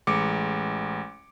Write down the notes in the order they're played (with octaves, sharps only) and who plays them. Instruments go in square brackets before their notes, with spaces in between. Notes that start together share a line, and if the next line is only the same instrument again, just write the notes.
[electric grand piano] A1 G#3 D6 C#7